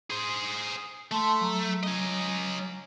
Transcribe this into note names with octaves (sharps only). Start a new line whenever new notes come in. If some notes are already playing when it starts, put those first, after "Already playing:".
G#4 C5
A3 A5 C6
F#3 A#5
C#4 D#5